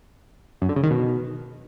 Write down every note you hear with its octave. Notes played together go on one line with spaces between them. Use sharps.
F#2
D3
C#3
D#3
B2